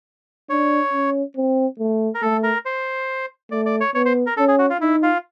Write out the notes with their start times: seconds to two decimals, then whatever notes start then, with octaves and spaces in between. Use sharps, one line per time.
0.50 D4 C#5
0.93 C#4
1.36 C4
1.79 A3
2.15 A#4
2.22 A3 A4
2.43 A#4
2.65 C5
3.51 A3 D5
3.66 D5
3.80 C#5
3.95 B3 C#5
4.05 C5
4.26 A#4
4.37 C#4 A4
4.48 G#4
4.59 F#4
4.70 F4
4.81 D#4 E4
5.03 F4